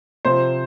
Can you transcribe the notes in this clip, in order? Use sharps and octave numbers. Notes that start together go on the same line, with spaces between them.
C3 F3 C5